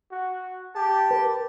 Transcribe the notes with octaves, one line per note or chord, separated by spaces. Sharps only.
F#4
G4 A5
A#4 B4